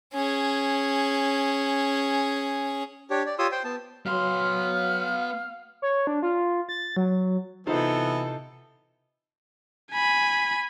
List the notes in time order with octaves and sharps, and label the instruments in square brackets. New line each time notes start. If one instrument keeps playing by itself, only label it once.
[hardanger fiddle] C#4 G#4
[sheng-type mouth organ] D4 G4 C#5
D5
F4 G4 C#5 C6 D#6 E6
C5 G5 C6
B3 A5
[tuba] F#3 [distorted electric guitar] B3 C6 [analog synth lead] F5 [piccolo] F6
[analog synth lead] C#5
D4
F4
A6
F#3
[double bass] C3 [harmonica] E3 B3 [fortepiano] D#4 F4 C5 [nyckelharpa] A4
[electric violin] G#5 B5